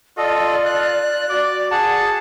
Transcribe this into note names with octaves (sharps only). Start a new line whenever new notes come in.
F4 A4 D5 D#5
F#6
F#4 D5
G#4 F#5 A5